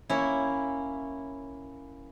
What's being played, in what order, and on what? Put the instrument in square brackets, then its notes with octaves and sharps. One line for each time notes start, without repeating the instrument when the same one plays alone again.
[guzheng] A#3 C#4 E4